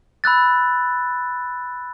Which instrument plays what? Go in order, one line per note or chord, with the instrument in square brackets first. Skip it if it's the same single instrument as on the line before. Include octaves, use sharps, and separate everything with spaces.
[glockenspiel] B5 E6 F#6 A6